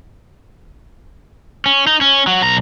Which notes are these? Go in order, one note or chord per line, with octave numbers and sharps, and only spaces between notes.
C#4
D#4
C#4
F#3
B1 A#5